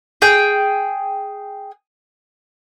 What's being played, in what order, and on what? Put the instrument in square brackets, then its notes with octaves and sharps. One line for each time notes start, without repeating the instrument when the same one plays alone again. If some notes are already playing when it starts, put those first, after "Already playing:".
[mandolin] G#4 G5